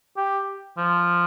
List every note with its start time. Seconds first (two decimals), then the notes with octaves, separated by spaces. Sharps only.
0.17 G4
0.78 F3